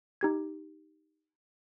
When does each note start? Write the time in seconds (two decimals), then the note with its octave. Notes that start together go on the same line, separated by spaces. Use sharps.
0.21 D#4 G4 G#6